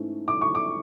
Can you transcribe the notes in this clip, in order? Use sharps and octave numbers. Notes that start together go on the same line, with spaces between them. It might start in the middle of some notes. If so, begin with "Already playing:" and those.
Already playing: G#2 E3 A3 C#4
D6
C#6
D6